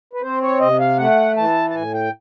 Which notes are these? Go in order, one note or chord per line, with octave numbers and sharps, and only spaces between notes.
B4
C4 C5
C#5
C3 D#5
F5
A3 F#5
E3 A5
A5
A2 G#5
G5